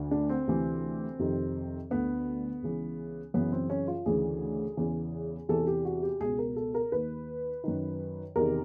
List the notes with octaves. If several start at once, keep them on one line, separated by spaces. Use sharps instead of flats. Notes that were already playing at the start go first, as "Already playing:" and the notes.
Already playing: D2 D3
D4
C4
D2 C3 E3
F2 C3 D#3
D2 D3 B3
C#2 C#3 E3
F#2 C#3 E3 B3
C4
C#4
F4
D2 C#3 E3 G#4
E2 C#3 E3
E2 C3 E3 A4
G4
F#4
G4
C#2 B2 G#4
A#4
A4
A#4
D#2 D#3 B4
F#2 D#3
E2 C3 D#3 A#4